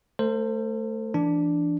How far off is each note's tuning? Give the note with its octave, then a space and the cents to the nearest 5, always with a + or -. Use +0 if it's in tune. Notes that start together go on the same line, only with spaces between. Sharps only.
A3 +0 A4 +45 C5 +0
E3 +30 D4 +0